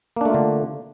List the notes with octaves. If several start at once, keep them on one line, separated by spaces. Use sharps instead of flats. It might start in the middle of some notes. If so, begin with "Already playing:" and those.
D3 A3 A#3 D4 F4